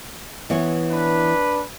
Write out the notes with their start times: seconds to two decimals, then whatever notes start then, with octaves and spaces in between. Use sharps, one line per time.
0.50 E3 B3 C#5
0.90 D4 B4